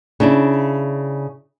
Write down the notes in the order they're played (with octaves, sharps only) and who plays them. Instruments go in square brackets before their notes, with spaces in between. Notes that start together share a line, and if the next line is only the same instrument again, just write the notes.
[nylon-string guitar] C#3 D4 E4